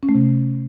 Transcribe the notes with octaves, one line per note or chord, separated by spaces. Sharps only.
C#4
A3
C3